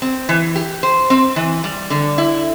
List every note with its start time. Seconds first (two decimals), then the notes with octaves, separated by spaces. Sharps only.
0.02 C4
0.29 E3
0.56 G4
0.83 C5
1.10 C4
1.36 E3
1.64 G3
1.90 D3
2.18 E4